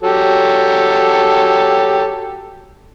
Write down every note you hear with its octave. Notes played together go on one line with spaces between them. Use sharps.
F#3 G4 A4